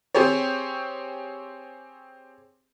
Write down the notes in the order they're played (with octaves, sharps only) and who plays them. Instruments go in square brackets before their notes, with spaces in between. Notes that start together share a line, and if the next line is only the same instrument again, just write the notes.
[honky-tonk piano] C4 G4 G#4 C5 C#5